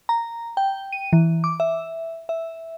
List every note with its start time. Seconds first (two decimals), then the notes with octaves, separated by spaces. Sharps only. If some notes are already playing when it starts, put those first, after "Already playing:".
0.09 A#5
0.57 G5
0.93 D#7
1.13 E3
1.44 D6
1.60 E5
2.29 E5